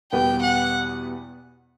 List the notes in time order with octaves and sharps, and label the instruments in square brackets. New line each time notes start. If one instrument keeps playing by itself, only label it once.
[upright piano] E2 B2 G3 B3 [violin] G5
[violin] F#5